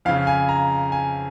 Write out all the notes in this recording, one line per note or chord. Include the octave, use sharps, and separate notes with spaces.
F2 C#3 F5
G#5
A#5
G#5